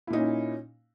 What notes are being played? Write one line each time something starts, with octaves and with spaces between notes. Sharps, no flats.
A#2 C#4 D#4 E4